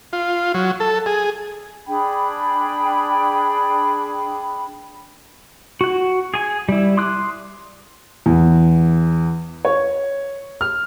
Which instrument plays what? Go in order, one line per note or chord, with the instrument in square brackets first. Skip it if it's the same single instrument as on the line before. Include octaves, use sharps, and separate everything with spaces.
[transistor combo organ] F4
F#3
A4
G#4
[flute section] D4 G#4 G5 B5
[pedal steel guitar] F#4 F#5
G#4 G#5
G3 E4
C6 D6 D#6 F#6
[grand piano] E2
C#5
F6